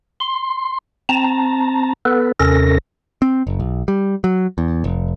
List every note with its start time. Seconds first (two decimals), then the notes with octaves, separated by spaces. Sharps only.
0.20 C6
1.09 C4 A5 A#5
2.05 B3 A4 B4
2.40 D#2 C3 C#4 A4 A#4 A#6
3.22 C4
3.47 F#1
3.60 B1
3.88 G3
4.24 F#3
4.58 E2
4.84 F1